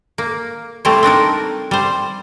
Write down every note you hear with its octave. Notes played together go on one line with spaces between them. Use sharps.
A#3
G3 A3 C4 E4 C5
C4 D4 D#4 A#4
G3 C5